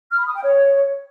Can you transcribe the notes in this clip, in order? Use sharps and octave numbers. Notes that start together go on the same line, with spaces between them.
F6
B5
D#6
G5
C#5